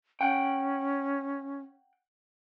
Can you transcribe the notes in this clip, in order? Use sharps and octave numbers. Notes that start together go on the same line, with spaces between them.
C#4 F#5 G5